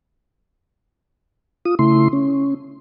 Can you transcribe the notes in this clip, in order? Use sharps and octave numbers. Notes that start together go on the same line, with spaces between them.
F4 D#6
C#3 A3 E4 C6
C#4